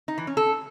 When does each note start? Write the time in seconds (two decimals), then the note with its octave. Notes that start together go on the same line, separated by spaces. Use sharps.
0.08 D#4
0.18 E3
0.27 C#4
0.37 A4